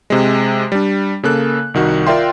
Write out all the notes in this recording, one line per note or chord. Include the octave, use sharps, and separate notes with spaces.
C3 G#3
G3 D4
C#3 A#3 A4 F#6
C2 D#3 F#4
F4 A#4 D5 E5 G5 C6